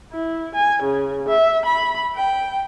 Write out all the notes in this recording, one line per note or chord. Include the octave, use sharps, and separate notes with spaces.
E4
G#5
C#3
E5
B5
G5